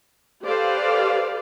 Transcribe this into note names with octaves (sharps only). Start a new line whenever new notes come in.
G4 A4 B4 C5 D5 F5